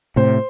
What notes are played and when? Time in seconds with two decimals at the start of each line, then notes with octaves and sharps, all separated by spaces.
0.16 A2 C3 C5